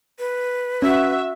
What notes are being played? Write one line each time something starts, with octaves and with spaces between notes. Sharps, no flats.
B4
C#4 F#4 E5